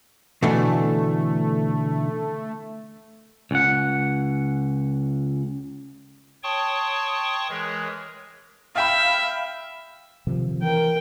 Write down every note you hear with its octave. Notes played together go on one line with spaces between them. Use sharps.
B2 D3 E3 A3
C#2 F#5
C#5 G5 A5 C6 C#6 D#6
E3 G#3 G#4 A#4 C#5
E5 F5 G5 B5
C3 D#3 F3
E3 A#4 G5